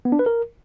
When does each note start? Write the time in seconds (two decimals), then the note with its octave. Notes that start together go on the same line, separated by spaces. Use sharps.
0.05 B3
0.12 D4
0.19 B4
0.26 A#4